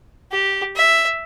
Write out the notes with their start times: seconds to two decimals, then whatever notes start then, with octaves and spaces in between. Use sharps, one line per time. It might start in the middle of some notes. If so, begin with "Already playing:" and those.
0.32 G4
0.76 E5